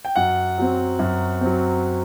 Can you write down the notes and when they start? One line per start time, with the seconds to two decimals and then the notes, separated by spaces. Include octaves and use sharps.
0.05 G5
0.16 F#2 F#5
0.58 F#3 C4
0.99 F#2
1.41 F#3 C4